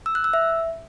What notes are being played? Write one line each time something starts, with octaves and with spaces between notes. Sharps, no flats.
E6
F#6
E6
E5